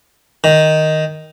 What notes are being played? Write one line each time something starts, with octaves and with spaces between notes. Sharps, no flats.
D#3